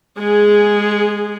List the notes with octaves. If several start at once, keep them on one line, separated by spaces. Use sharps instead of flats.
G#3 G#4